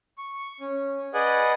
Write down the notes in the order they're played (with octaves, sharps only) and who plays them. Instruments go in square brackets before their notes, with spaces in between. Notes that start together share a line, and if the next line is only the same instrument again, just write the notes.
[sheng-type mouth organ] C#6
C#4
G#4 B4 D5 D#5 F#5 G#5